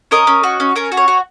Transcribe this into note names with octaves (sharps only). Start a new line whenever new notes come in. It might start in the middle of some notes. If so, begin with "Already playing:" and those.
C#4 A#4 D#5
C#4
F#4
C#4
C#4 A#4
F#4
C#5
F#4